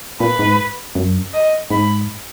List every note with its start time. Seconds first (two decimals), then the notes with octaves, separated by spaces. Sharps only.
0.20 A#2 B4
0.39 G#2
0.95 F#2
1.34 D#5
1.70 G#2 B5